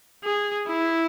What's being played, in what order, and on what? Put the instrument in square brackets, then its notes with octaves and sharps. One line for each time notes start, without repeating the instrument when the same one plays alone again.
[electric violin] G#4
E4